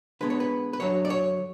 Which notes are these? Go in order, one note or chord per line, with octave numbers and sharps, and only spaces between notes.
D3 G#3 B3 B4
C#5
B4
B4
F#2 D3 F#3 C#5
D5
C#5